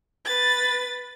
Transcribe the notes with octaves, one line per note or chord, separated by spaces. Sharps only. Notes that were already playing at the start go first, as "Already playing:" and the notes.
B4 A6